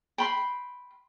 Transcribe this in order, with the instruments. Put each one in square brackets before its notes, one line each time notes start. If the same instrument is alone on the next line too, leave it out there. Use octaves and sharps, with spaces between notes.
[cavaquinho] G5 B5 C6